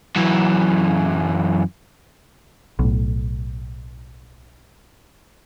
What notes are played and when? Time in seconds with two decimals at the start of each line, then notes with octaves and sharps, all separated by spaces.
0.16 F#2 E3
2.79 B1 A2